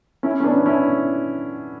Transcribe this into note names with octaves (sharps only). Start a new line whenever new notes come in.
C#4 E4
C#4
B3 D4
C#4 E4